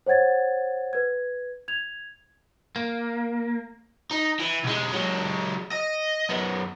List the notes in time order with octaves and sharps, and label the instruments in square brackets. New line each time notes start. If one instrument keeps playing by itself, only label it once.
[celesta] C5 C#5 F#5 G#6 A6
B4 G#6
G#6 F7
[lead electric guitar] A#3
[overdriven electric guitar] D#4
E3
B1 G#3
F#3 G#3
D#5
F#2 B3